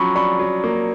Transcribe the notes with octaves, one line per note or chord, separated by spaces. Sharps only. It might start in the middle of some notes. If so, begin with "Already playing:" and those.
Already playing: F3 F#3 C#4 B5 C#6
D4 B5 C#6
F#3
A#3